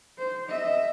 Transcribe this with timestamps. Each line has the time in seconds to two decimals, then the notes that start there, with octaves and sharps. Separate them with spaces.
0.19 C5
0.49 D#5 E5